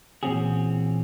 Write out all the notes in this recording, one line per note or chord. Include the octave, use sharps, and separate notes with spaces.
A#2 E3 C4 C#4 F#4 G#4